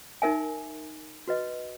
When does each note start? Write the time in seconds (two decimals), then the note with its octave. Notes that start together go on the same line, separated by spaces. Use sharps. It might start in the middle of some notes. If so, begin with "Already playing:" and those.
0.22 D#4 A#4 E5 G#5
1.28 F#4 B4 D#5